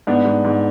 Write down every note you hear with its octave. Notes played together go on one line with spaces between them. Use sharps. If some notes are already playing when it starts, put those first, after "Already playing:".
G#2 B3 D4
G#2
G#2